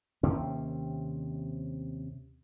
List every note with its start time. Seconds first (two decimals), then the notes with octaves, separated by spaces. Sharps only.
0.23 D#2 C3 C4 C#4